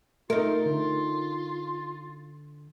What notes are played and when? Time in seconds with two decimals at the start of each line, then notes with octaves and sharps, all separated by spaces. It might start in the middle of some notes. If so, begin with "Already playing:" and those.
0.30 A3 D#4 F4 A#4
0.66 D3